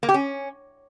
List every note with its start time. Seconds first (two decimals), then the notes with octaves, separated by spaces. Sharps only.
0.03 A#3
0.09 G4
0.14 C#4